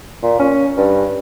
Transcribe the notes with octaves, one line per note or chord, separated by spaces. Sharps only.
A#2
C#4
G2